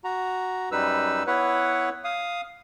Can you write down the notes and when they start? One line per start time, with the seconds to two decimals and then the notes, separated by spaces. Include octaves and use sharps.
0.04 F#4 A#5
0.72 F#2 G3 D#4 B4 E6
1.27 B3 E4 B4 C#5 F#5
2.04 F5 D#6